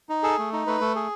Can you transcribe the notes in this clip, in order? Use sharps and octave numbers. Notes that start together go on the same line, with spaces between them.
D#4
G#4 A4
A3
D#4
A3 B4
A3
G#4